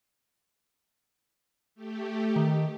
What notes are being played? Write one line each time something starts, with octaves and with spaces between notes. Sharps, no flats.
A3 G4
D#3